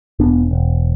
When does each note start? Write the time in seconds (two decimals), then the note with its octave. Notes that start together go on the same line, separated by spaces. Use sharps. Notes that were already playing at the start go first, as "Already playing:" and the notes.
0.19 E1 B3 D4
0.51 E1